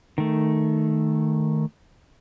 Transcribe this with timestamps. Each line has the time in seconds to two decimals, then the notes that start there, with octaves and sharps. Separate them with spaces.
0.18 D#3 A3